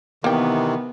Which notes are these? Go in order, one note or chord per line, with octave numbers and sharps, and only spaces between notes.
C3 D#3 E3 A#3 B3 G5